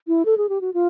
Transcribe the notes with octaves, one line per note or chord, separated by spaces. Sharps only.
E4
A4
G#4
G4
F#4
F4